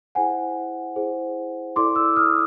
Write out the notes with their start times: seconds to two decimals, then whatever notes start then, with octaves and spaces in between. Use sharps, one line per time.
0.15 E4 G#4 C5 F#5 G#5
0.96 E4 G#4 C5
1.76 E4 A4 D5 C6 D6
1.96 D6 E6
2.16 D#6 F6